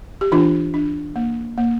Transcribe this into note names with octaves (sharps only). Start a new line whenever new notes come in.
G4
E3 D4 F4
D4
A#3
A#3